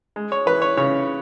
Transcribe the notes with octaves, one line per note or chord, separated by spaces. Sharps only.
G#3
C#5
E3 B4
C#5
C#3 C#5